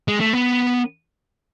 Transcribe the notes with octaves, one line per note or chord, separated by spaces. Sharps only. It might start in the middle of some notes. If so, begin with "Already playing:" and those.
G#3
A3
B3